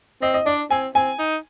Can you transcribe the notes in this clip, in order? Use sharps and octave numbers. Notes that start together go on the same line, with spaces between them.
C4 D#5
D#5
D4 D5
C4 G#5
C4 G#5
D#4